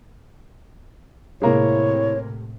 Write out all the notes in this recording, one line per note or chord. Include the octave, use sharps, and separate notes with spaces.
A2 C3 G#3 A#3 E4 C#5